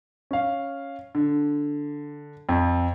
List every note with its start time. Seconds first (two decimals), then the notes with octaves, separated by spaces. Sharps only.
0.31 C#4 F5
1.15 D3
2.49 F2